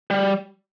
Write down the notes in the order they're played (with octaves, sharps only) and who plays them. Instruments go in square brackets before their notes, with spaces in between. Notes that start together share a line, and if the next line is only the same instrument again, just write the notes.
[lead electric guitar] G3